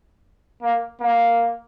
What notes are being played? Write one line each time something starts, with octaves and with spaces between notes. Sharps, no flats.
A#3
A#3